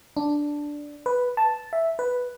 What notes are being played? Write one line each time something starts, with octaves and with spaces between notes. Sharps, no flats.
D4
B4
A5
E5
B4